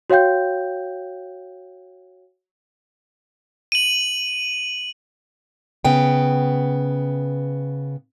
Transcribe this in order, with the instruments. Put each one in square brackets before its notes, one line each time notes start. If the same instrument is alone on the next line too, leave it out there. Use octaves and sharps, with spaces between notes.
[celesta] F#4 C#5 F5 G5 G6
[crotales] D#7 F#7
[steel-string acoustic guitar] C#3 B3 G5